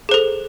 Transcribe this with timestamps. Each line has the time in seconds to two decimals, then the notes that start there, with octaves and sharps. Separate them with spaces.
0.09 G#4
0.11 C5
0.14 A4